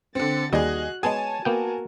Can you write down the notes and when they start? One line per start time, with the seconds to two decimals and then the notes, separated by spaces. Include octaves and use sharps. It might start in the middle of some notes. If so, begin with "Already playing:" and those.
0.15 D3 C4 A6 C#7
0.53 D#2 G3 F#4 G#4 D#5 F#6
1.03 G#3 B3 G#4 C#5 G#5 A5
1.45 A#3 B3 F#4 A#4 G5